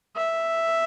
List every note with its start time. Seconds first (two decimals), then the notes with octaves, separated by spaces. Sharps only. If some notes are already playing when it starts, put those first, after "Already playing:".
0.16 E5